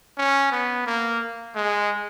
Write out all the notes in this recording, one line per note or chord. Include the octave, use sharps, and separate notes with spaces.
C#4
B3
A#3
G#3